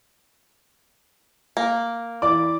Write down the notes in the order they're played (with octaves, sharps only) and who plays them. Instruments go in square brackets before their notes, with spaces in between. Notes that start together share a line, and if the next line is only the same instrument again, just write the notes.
[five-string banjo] A#3
[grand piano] E3 D5 D6